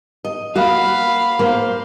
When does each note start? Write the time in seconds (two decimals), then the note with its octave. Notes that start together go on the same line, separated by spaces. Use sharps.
0.25 D#5
0.56 A#3 F#4 F5 B5
1.39 A#3 C5